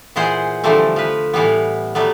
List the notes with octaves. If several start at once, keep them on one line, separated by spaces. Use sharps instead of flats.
A#2 E3 G#4 C5 F#5
D3 E3 F3 G3 A3 C4
F3 B4
A2 E3 G3 B3
F#3 G3 A3 B3